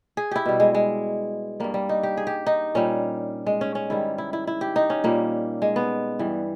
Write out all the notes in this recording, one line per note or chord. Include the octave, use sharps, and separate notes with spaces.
G#4
E4 G4
B2 G3
G#3
G#3
G2 G3 A#3
G3
D#4
G4
G#4
G4
D#4
A#2 G3 C#4
G#3
C#4
C#4
G#2 D#3 G3 E4
E4
E4
E4
G4
D#4
C#4
A#2 G3 A#3
G#3
B3
G2 E3 G3